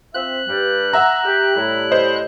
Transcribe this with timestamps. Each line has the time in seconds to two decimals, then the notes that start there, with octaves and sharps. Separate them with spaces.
0.14 C4 F4 E5 F#6
0.48 G2 G3
0.93 E5 F#5 A#5 E6
1.24 G4
1.55 A2 G3 E4
1.91 C5 D#5